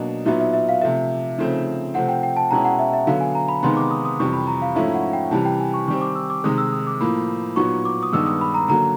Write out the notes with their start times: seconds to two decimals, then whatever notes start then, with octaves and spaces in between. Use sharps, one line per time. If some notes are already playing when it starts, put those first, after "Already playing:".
Already playing: B2 F#3 A#3 D4 D#5
0.25 A#2 F#3 B3 D#4 E5
0.40 E5
0.53 E5
0.69 F5
0.82 C3 F3 A3 E5
1.38 C#3 F3 A3 C4 D#4
1.94 C3 F3 A3 C4 F#5
2.09 G5
2.23 G5
2.37 A5
2.51 B2 G#3 C#4 E4 A#5
2.65 F#5
2.79 E5
2.94 E5
3.07 D3 F#3 B3 F5
3.20 G#5
3.35 A#5
3.49 B5
3.63 C3 D#3 G#3 B3 D#4 C6
3.77 D6
3.91 D#6
4.05 D#6
4.19 F2 C3 E3 G3 C#6
4.33 B5
4.47 A#5
4.62 F5
4.76 G#2 F3 A3 C#4 E4 E5
4.95 F#5
5.13 G5
5.31 C3 E3 G3 A5
5.45 G5
5.60 G#5
5.74 C#6
5.88 D#3 G3 C4 C#6
6.01 D6
6.15 E6
6.30 D6
6.44 C3 D#3 G#3 D#6
6.58 E6
6.72 D#6
6.87 D6
7.01 A2 F3 A#3 B5
7.56 A#2 F#3 B3 D#4 C#6
7.85 D6
8.03 D#6
8.13 G2 D#3 G#3 B3 D#4 E6
8.26 D#6
8.41 B5
8.54 A#5
8.68 D3 F#3 A#3 A#5